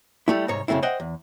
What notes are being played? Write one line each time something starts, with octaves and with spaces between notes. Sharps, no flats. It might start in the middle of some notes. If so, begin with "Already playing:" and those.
G3 A3 E4
C2 G#2 C#5 A#5
F#2 C#3 A3 C4 E4
C5 D#5 E5 F#5 G5
E2